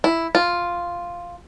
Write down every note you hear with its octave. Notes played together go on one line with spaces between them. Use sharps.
E4
F4